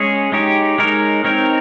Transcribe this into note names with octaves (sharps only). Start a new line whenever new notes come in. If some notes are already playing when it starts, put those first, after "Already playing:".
Already playing: G#3 C#4 G#4 C#5
G#3 D#4 G4 C#5
G#3 D#4 A#4 C#5
C4 D#4 A#4 C#5